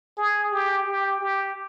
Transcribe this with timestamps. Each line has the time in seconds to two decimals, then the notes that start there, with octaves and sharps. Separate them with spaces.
0.18 G#4
0.52 G4
0.86 G4
1.21 G4